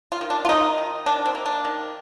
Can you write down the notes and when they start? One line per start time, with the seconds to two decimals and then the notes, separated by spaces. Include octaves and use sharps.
0.12 F4
0.21 D#3
0.30 D4
0.45 F4
0.49 D#3 D#4
0.78 D#3
1.06 D#3 D4
1.26 C4
1.35 A#3
1.46 D4
1.65 D#3